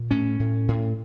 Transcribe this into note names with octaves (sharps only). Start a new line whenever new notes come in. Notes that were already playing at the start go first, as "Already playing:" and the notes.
Already playing: A#2
A2 C#4
A2
A2